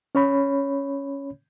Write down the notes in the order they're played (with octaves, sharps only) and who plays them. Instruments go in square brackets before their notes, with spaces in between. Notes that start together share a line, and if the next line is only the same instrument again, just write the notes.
[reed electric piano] C#4 C#5 B5